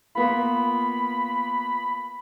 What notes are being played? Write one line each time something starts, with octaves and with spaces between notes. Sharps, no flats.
A#3 B3 F4 B5